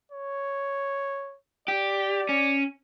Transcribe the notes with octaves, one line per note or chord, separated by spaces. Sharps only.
C#5
G4 D5
C#4